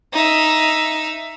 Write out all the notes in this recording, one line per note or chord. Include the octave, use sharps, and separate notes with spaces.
D#4 E5